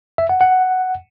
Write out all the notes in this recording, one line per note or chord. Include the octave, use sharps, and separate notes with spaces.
E5
F#5
F#5